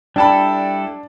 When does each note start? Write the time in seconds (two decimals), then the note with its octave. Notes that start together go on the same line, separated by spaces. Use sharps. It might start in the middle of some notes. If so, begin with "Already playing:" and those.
0.16 G3 D4 E4 A4 G5 A5 B5